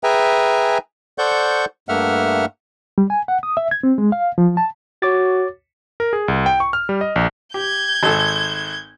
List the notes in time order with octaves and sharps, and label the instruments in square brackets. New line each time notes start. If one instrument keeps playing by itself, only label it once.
[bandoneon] G#4 B4 E5 G5 G#5 A#5
A4 C5 D5 F#5 C#6 G6
G2 A3 A#3 E5 F#5 F6
[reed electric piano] G3
G#5
F#5
D#6
E5
G#6
C4
G#3
F5
F3
A5
[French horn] F#4 [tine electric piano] C#5 D6 A6
[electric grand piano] A#4
G#4
C2
G5
C#6
F6
G3
D#5
A#1
[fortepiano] G4 [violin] G6 G#6
[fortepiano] G#1 A4